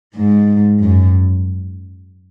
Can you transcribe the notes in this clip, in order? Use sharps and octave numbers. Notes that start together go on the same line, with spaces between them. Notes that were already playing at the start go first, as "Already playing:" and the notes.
G#2
F#2